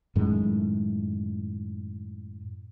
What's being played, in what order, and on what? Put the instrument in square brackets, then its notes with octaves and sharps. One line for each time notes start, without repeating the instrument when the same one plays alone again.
[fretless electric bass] F#2 A2 D#3 G#3